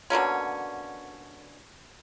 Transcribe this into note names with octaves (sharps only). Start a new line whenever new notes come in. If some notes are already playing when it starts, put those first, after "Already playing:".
B2 D3 A#3 C#4